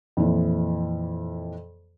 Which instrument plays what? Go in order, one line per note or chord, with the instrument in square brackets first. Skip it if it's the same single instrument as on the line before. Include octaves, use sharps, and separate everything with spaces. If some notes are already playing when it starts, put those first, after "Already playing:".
[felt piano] F2 A#2 E3